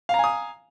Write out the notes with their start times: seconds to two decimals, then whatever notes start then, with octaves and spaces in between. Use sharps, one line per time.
0.09 F5
0.14 A#5
0.19 G#5
0.24 D#6